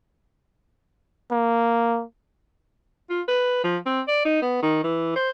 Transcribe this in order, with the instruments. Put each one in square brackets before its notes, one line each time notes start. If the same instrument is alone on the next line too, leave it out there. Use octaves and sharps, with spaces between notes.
[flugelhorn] A#3
[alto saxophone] F4
B4
F3
C4
D5
D#4
B3
D#3
E3
C5